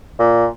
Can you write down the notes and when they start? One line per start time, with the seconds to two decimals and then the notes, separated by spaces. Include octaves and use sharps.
0.19 A#2